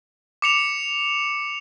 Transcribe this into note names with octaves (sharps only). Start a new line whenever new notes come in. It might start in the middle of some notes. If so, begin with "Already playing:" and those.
D6 C#7 F7